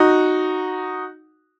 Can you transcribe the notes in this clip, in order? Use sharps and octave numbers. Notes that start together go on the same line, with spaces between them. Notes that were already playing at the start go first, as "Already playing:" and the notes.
Already playing: D#4 F#4